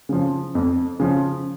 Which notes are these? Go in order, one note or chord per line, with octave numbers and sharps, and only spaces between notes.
C#3 F3
F2
C#3 F3